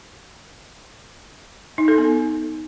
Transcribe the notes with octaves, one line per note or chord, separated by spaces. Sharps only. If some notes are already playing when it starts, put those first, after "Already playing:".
D#4
A4
B3